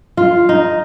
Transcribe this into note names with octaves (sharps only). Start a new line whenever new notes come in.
F4
D#4